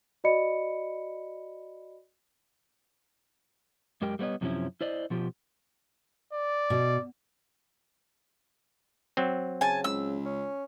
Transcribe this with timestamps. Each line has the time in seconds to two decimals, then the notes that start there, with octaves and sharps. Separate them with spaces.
0.24 F#4 D5 D#5 B5 C#7
4.02 F#2 G#3 G4 A#4 G5
4.19 G3 A3 B3 C#5 D#5
4.41 F#2 C3 F3 A#3 C#4 E4
4.81 E4 C5 D5 D#5
5.10 B2 F3 F4 G4
6.33 D5
6.70 B2
9.17 F#3 C4
9.61 C#3 G#5 A5
9.84 C#2 E6
10.25 C#4